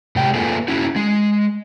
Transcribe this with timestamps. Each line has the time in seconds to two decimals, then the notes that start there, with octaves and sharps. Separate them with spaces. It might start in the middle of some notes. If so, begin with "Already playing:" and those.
0.16 C3 G#3 G4 G5
0.34 A#3 F4 G#4 A4 B4 G#5
0.68 C#4 E4 F#4
0.96 G#3